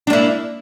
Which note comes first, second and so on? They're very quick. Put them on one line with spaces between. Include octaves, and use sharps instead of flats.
D4 A#3 E4